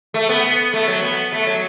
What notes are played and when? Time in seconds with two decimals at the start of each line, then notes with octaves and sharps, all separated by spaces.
0.14 A3
0.29 B3
0.73 A3
0.88 F#3
1.03 B3
1.33 A3
1.47 F#3